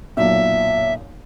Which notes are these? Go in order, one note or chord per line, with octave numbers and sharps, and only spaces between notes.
B1 F#2 A#2 E5